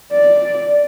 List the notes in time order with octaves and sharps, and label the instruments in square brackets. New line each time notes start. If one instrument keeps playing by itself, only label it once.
[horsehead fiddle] D5